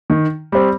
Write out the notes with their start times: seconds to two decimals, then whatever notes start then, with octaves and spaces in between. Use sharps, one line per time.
0.10 D#3
0.52 G3 C4